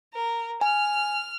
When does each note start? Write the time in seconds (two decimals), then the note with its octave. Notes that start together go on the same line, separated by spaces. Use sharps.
0.14 A#4
0.61 G#5 F6